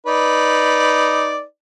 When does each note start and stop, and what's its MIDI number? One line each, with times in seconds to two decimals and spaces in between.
0.07 1.42 63
0.07 1.42 71
0.07 1.42 74